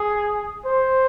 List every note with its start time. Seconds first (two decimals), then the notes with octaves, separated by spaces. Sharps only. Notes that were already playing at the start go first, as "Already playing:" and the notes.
Already playing: G#4
0.65 C5